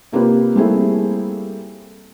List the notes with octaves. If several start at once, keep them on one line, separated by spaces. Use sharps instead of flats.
C3 A#3 F4 G4 B4
G3 A3 A#3 C4 E4 G#4